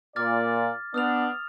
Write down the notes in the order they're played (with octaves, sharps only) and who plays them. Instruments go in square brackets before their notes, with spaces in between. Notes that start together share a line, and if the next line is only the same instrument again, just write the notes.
[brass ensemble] A#2 D5 [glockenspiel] D6 F6 A6
[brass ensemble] B3 D4 [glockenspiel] D#6 F6 F7